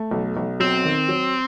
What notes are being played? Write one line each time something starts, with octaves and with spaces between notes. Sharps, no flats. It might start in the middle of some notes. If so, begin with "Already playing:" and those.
Already playing: A3
B1
B1
F#3 C4
D#3
F#3